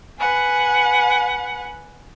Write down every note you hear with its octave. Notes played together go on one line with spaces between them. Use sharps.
B4 F#5 G#5